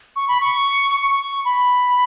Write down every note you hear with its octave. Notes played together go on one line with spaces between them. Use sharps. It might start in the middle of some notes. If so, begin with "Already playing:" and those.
C#6
B5
C#6
C#6
B5